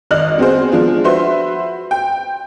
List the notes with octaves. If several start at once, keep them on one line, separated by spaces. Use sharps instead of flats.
G#1 D5 D#5 F6 F#7
B3 C4 F#4 G#4 C5
F3 G#3 D4 F4
F#4 B4 C5 E5 C6
G5